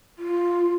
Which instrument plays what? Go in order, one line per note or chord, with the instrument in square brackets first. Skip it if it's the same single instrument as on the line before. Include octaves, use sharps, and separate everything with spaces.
[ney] F4